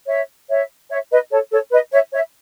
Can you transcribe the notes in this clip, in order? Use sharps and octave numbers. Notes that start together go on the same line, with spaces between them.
C#5 E5
C#5 E5
C#5 E5
B4 D#5
A4 C#5
A4 C#5
B4 D#5
C#5 E5
C#5 E5